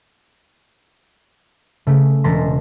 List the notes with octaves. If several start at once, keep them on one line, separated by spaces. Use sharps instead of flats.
C#3 A3
E1 G#3 A5 A#5 C6 B6